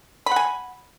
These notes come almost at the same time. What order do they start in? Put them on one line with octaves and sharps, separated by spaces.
B5 F#5 G#5